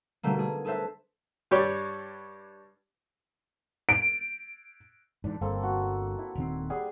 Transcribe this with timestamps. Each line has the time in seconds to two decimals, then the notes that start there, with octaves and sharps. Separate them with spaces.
0.23 B2 D3 G3 A3 A#3
0.38 A#3 G#4
0.65 G#4 A4 B4 C5 E5
1.51 G2 G3 G4 C#5 D5
3.89 D7
5.24 G#2 E3 D4
5.41 G1 G2 A#3 C4 A4
5.63 F#4
6.19 E4
6.35 D#1 D#3 C4
6.70 G3 G#4 F#5